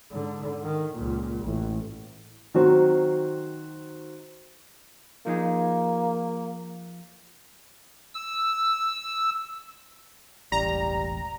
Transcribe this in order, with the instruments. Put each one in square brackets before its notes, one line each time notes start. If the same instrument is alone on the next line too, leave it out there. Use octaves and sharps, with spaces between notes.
[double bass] G#2 D3
D#3
C#2 A#2
A1
[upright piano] D#3 F#3 C4 F#4 C5
[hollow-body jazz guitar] F3 D#4 G#4 [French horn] A#3
[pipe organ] E6
[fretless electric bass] E1 A1 [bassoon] G3 [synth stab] A#5